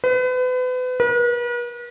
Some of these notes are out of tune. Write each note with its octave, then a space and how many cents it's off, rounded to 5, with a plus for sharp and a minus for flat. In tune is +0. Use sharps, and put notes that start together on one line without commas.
B4 +35
B4 -45